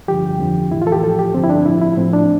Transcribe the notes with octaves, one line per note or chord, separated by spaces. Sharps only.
G2 D3 F3 G4
F2 D3 F3
A2 E3 E4
F4
A4
G4
A2 F3 A4
G4
G2 D3 F3 C4
E4
D4
A2 F3 E4
E4
A2 F3 C4
D4